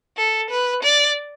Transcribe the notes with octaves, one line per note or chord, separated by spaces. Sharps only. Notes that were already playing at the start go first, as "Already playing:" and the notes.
A4
B4
D5